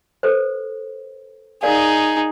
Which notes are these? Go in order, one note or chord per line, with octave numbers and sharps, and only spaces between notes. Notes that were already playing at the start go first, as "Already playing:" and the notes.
A4 B4 C5
D#4 G#4 A#4 D5 F5